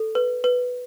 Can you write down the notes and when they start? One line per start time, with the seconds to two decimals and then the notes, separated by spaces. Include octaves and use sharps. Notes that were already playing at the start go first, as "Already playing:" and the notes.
Already playing: A4
0.15 B4
0.44 B4